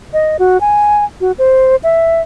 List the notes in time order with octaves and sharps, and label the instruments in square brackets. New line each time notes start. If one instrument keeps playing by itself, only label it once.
[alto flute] D#5
F#4
G#5
F#4
C5
E5